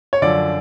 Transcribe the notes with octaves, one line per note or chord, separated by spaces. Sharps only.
C#5
F#2 D3 F3 D5